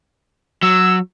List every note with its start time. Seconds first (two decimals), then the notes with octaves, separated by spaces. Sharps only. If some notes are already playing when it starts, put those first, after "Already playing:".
0.63 F#3 E6